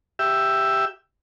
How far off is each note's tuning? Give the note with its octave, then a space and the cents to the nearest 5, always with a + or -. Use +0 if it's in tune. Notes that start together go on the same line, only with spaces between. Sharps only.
G4 +0 E5 +10